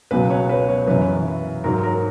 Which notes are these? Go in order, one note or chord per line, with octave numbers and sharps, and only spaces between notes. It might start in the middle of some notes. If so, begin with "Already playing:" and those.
C#2 B2 F#3 B4
C#5
B4
C#5
F#2 E3 B4
G#2 F#3 A#4
A#4